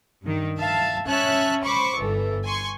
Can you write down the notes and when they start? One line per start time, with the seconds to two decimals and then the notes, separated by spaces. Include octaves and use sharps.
0.23 G2 D#3
0.58 E5 F5 A5
1.06 C#4 C#5 E5 A5 F#6
1.64 C5 B5 C#6 D6
1.97 G1 E3 A4
2.44 G#5 C6 C#6